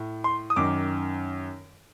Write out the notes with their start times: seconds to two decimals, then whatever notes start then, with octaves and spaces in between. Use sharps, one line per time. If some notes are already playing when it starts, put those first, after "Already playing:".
Already playing: A2
0.24 C6
0.50 D#6
0.56 F#2 D#3 D6